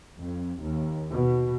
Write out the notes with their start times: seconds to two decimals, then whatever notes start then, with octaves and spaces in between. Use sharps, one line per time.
0.17 F2
0.62 D#2
1.10 B2